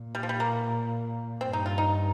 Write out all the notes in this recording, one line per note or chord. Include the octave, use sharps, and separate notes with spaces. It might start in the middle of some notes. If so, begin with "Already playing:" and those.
Already playing: A#2
G3
F3
G3
A#3
G2 C4
D#4
F4
D#4